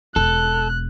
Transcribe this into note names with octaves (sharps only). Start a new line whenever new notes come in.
E1 A4 F#6